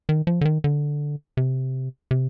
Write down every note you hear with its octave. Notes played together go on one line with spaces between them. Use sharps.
D#3
F3
D3
D#3
D3
C3
C3